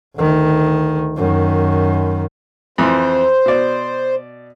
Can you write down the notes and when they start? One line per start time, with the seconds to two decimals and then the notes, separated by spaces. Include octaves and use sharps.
0.16 D2 D#3
1.16 F#2 D#3
2.78 F2 E3 C5
3.46 B2 D5